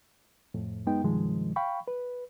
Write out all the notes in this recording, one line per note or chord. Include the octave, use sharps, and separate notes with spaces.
F2 A2
F#2 G#3 B3 D#4 G5
G2 C3 D#3 F3 G#3
F5 G5 B5 C#6
B4